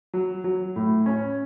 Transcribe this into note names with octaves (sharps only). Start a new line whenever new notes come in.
F#3
F#3
A2
C#4